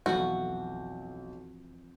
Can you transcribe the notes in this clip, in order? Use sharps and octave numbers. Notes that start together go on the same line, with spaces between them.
B1 F2 E3 F#4 G6